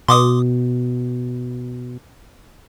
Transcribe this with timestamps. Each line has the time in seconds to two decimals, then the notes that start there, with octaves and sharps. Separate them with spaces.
0.08 B2 C6 D6 D#6